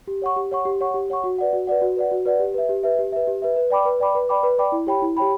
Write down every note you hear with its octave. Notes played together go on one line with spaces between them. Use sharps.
G4
C#5 F#5 C#6
G4
C#5 F#5 C#6
G4
C#5 F#5 C#6
G4
C#5 F#5 C#6
F#4
B4 D5 F#5
F#4
B4 D5 F#5
F#4
B4 D5 F#5
F#4
B4 D5 F#5
G4
B4 E5
G4
B4 E5
G4
B4 E5
G4
B4 E5
B4
D5 G5 B5 D6
B4
D5 G5 B5 D6
B4
D5 G5 B5 D6
B4
D5 G5 B5 D6
E4
G4 C#5 G5 B5
E4
G4 C#5 G5 B5